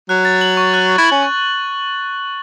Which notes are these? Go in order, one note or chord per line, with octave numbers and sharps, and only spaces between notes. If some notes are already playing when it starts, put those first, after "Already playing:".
F#3 F#6
A6
F#7
C#6
F#6
A6
E4
C#4 F#7
C#6